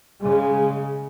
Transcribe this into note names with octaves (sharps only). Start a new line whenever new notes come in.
C#3 G#3